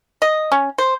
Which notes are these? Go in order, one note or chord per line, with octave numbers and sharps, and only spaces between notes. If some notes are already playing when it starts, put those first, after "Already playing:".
D#5
C#4
C5